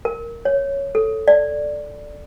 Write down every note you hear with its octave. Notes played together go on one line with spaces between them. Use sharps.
A#4
C#5
A4
D5